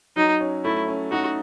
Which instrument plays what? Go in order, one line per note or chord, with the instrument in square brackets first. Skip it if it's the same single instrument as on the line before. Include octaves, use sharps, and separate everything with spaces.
[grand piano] F#3 [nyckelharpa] D#4
[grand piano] C#4
[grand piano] A3 [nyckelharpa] E4
[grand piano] C#4
[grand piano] D#4 [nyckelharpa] F#4